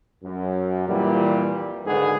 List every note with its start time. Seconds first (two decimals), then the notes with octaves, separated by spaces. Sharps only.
0.24 F#2
0.88 F2 A#2 E3 G3
1.86 B1 G#2 D3 D#3 B3 G#4